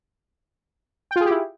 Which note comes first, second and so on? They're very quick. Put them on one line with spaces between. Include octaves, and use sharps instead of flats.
G5 F4 G#4 G4 E4